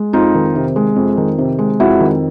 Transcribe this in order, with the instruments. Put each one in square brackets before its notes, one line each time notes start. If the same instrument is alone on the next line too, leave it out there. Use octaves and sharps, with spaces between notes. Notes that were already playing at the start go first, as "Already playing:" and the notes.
Already playing: [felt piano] G#3
F2 D#4 F4
D#3
C3
G#3
F2
D#3
C3
G#3
F2 E4 F#4
D#3